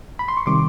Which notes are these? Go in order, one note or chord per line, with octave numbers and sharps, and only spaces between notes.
B5
C6
C#6
C3 D#3 G3 C6 D6